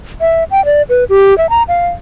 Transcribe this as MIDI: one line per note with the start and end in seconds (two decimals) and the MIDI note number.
0.21 0.44 76
0.51 0.64 79
0.65 0.82 74
0.89 1.04 71
1.10 1.36 67
1.38 1.49 76
1.50 1.63 82
1.68 1.88 77